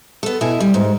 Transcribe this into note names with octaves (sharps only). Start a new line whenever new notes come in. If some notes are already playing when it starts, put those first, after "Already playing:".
B3 A4
B2 E4 G#5
G3
G#2